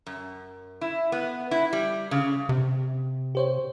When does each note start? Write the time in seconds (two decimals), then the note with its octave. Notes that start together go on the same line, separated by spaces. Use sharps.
0.06 F#2
0.81 E4
1.12 B3
1.51 E4
1.73 G3
2.11 C#3
2.49 C3
3.35 G4 C5 C#5